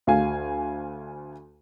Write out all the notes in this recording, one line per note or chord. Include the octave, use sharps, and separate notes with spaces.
D2 F5 G#5